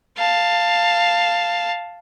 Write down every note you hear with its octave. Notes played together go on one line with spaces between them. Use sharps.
F5 A5